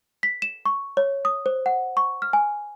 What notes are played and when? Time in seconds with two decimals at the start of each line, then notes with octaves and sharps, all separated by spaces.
0.23 B6
0.42 E7
0.66 C#6
0.97 C#5
1.25 D#6
1.46 C5
1.66 F#5
1.97 C#6
2.22 F6
2.33 G#5